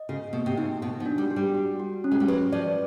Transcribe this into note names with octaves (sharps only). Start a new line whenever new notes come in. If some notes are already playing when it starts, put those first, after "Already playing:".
Already playing: D#5
C#3 F#4
B2 A#3
C3
C#3 D#4
B2 F#4
F3
D4
G3
F#4
G3
F#4
F#4
C#4
G#3
G3
F#3 B4
F3 D5